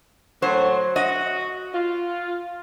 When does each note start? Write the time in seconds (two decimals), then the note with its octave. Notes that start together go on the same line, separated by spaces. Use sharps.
0.42 A2 F#3 C5
0.96 F#4 D#5
1.74 F4